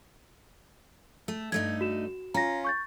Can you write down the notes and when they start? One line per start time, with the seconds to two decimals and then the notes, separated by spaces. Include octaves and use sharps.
1.28 A3
1.52 G2 A3 D#4 G#6
1.81 F#4 E7
2.34 C#4 F4 A#5 A#6
2.64 C#6 G6 A6